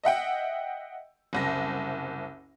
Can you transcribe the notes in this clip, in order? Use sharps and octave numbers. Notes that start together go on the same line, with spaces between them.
D#5 E5 F#5 G5
F#1 C2 A#6